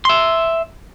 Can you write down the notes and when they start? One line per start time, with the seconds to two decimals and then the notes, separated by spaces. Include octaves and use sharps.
0.05 E5 C6